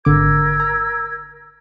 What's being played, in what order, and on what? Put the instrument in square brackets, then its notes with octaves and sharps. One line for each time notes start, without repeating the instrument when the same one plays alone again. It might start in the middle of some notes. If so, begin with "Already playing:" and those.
[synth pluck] G#1 D3 D6 [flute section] A#4 E6 G#6
[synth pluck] A#5